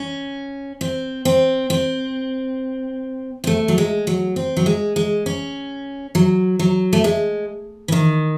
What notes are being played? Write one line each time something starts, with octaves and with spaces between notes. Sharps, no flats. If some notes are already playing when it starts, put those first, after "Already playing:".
Already playing: C#4
C4
C4
C4
C4
A3
F#3
G#3
F#3
C4
F#3
G#3
G#3
C#4
F#3
F#3
A3
G#3
E3
D#3